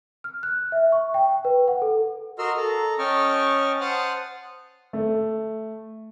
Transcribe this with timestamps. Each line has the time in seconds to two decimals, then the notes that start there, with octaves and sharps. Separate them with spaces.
0.24 F6
0.43 F#6
0.72 E5
0.92 C#6
1.14 G5
1.45 B4
1.68 F#5
1.82 A4
2.39 F#4 A#4 D#5 C6 E6 F6
2.56 A4 A#5
2.99 C#4 D#5 G5 A5 C#6 F6
3.81 C5 F#5 A5 D#6 F6 F#6
4.93 A3